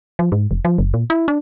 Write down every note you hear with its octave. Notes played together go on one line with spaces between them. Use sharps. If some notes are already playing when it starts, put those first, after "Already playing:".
F3
G#2
F1
F3
F#1
A#2
E4
D4